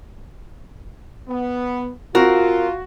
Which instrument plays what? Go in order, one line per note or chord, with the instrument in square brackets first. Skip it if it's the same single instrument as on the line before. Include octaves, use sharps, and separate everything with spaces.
[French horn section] B3
[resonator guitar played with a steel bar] C4 A#4 [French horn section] F4 [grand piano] F#4